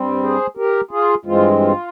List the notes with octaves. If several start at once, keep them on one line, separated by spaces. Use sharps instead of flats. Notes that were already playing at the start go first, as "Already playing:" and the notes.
Already playing: G2 G3 C4
G#4 C5
G4 A#4
F4 G#4
G2 E3 G#3 C4 F4
F4